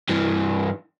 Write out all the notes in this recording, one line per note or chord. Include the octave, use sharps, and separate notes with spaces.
G2 E3